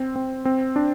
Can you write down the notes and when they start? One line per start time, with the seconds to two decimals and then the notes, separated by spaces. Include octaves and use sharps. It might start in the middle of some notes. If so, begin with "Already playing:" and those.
Already playing: C4
0.16 C4
0.45 C4
0.76 D4